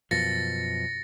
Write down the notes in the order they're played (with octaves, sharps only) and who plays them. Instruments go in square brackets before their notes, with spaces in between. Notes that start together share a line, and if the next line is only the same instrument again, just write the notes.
[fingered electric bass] F#2 B2 F3 [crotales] A6 A#6 C#7